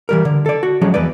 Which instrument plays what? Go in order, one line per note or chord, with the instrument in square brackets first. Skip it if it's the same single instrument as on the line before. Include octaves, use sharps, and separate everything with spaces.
[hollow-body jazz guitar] E3 G3 A#4
D3
A4 D5
F#4
F3 F#3 G#3 C#4
E2 B4 D5